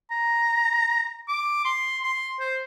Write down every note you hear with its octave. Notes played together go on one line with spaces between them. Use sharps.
A#5
D6
C6
C6
C5